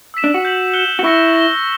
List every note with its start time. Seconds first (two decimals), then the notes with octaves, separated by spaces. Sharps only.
0.14 E6 B6 E7
0.24 D4
0.34 F#4
0.45 G6 B6 F#7
0.74 F#6 C#7 E7 G7
0.99 F#4
1.04 E4 C#6 E6 A#6 C#7 G7
1.34 A#6 E7 G7